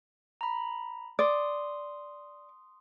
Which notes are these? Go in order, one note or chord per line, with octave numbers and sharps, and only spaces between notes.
A#5 B5
D5 C6 D#6